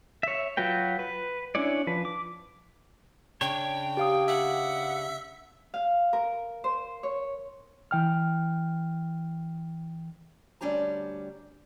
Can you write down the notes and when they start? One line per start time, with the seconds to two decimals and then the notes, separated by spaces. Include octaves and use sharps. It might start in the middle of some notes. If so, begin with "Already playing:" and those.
0.23 C#5 E5
0.57 F#3 F4 F#4 B4 G5
0.99 B4
1.55 C#4 D4 E4 C#5 D5
1.87 F3 B4
2.05 D6
3.41 C#3 D4 C#5 G5
3.97 G4 F5 D#6
4.28 E5 F#5
5.74 F5
6.13 A#4
6.64 C5
7.03 C#5
7.91 E3 G5 F6
10.61 D2 G3 C#4 D4 G4 A#5